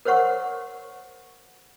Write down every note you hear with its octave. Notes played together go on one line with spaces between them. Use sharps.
A#4 C5 C#5 F#5 C#6